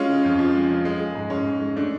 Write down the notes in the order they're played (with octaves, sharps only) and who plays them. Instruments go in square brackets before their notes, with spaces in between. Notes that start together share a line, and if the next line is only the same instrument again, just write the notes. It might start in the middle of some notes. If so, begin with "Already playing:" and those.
Already playing: [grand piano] G#3 C#4 F4
C#3
F2
F3
G#3
C#3
G#3
G#3
G#2
G#2 C#4
G#3
G#3
A3 D4